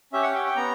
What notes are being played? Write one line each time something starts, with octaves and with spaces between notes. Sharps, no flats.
C#4 G4 E5
F#5
G5
G5
B3 A#5